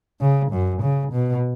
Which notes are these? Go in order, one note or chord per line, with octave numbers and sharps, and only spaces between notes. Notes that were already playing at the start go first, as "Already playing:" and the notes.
C#3
F#2
C#3
B2